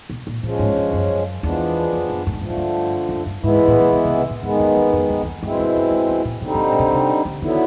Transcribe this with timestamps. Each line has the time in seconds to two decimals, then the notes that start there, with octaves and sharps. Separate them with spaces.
0.10 B2
0.27 A#2
0.43 A#2 F3 G#3 C#4
0.59 G#2
0.76 G2
0.93 F#2
1.43 E2 F3 G#3 B3 D4
1.93 F2
2.10 F#2
2.27 G2
2.34 G#2
2.41 G2 D3 F3 A3
2.50 G#2
2.57 G2
3.09 F#2
3.26 G2
3.43 G#2 E3 G#3 B3 E4
3.68 A2
3.80 A#2
3.93 B2
4.05 C3
4.18 C3
4.30 A#2
4.42 G#2 D#3 G#3 B3
4.59 F#2
4.76 F2
4.93 F2
5.10 F2
5.22 E2
5.25 F2
5.42 G2 B2 G#3 C4 E4
5.59 F2
5.76 F#2
5.92 G2
6.09 F2
6.25 A#2
6.42 B2 D3 G3 C4 D#4
6.55 A#2
6.67 A2
6.79 B2
6.92 C3
7.25 D3
7.42 D3 D#3 F#3 B3 E4